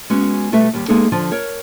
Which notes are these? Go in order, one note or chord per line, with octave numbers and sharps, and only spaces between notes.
G#3 B3 C#4 F#4
B2 G3 A3 A4 B4 E5
D#2 G3
G#3 A#3 B3 D#4 G#4 A4
D3 F3 F4 D5
A#4 C#5